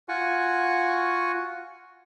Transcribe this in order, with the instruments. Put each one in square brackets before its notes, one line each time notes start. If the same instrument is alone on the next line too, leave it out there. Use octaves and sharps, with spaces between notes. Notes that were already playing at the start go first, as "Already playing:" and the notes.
[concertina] F4 F#4 F#5 G#5 C#6